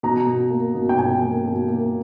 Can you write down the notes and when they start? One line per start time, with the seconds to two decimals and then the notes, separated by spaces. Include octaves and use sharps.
0.03 B2 A#5
0.27 B2
0.50 A#3
0.75 B2
0.89 G5
0.98 B2 G#5
1.22 A#3
1.46 B2
1.68 A#3